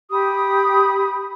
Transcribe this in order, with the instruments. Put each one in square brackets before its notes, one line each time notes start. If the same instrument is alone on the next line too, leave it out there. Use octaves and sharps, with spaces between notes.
[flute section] G4 B5 D#6